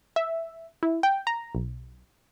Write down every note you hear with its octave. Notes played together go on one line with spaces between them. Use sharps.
E5
E4
G5
A#5
B1